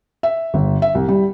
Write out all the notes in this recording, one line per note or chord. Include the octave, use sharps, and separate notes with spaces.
E5
G1
E5
C2
G3